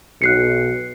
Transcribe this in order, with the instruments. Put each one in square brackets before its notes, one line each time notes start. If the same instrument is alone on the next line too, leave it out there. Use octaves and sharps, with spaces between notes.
[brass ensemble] B1 [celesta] F#6 C7 C#7